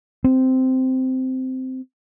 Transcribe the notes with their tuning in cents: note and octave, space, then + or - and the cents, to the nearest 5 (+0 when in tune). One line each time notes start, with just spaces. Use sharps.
C4 -10